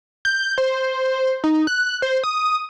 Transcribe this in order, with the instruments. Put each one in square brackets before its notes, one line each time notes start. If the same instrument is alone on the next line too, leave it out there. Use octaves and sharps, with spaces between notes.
[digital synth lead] G6
C5
D#4
F#6
C5
D#6